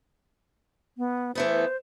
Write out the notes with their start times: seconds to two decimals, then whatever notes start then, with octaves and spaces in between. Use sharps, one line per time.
0.98 B3
1.35 E3 A3 B3 C5